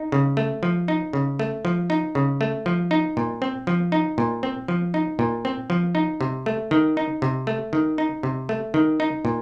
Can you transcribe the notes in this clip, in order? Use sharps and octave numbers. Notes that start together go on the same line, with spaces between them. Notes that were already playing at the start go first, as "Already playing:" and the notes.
Already playing: D#4
C#3
A3
F3
D#4
C#3
A3
F3
D#4
C#3
A3
F3
D#4
A#2
C4
F3
D#4
A#2
C4
F3
D#4
A#2
C4
F3
D#4
C3
A3
D#3
D#4
C3
A3
D#3
D#4
C3
A3
D#3
D#4
A#2